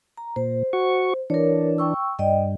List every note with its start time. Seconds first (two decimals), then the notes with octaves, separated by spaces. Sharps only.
0.17 A#5
0.36 A#2 C5
0.73 F#4 C#6
1.30 E3 D4 A#4 C#5
1.78 G5 C#6 E6
2.19 G2 D5 D#5 G5